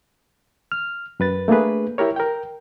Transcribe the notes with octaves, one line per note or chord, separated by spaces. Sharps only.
F6
F#2 B4 A6
A3 A#3 D4 G#4 B4
E4 G4 A#4 C#5
A#4 G5